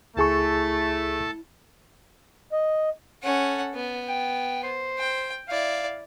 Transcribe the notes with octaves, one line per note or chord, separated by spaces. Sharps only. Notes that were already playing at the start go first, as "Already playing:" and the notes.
C#2 A3 E4 G#4 A4 A5 C#6
D#5
C#4 A4 F#5
B3
G5
C5
G5
E4 D5 F5